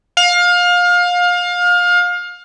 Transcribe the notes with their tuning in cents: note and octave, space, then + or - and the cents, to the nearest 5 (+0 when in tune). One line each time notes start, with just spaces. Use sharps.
F5 +25